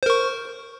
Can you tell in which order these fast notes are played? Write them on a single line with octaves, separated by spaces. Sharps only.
C5 A#4 C#6